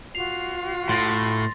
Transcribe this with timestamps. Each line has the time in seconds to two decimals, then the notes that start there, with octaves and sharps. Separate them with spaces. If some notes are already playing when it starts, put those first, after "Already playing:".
0.15 F4 F#4 C7 F7
0.89 A2 C6 A6 A#6